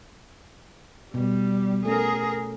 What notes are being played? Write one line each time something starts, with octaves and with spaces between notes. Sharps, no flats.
B2 G3
A3 C#4 G#4 A#4